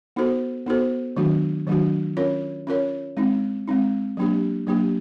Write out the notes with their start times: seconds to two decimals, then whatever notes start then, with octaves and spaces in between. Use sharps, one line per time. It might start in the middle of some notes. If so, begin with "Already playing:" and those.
0.16 B3 D#4 F#4 A4 C5
0.66 B3 D#4 F#4 A4 C5
1.16 D#3 F#3 A3 D4 F#4
1.67 D#3 F#3 A3 D4 F#4
2.17 C#4 F4 A#4 C#5
2.67 C#4 F4 A#4 C#5
3.17 G#3 C4 D#4
3.67 G#3 C4 D#4
4.17 F#3 A#3 D4 G4
4.67 F#3 A#3 D4 G4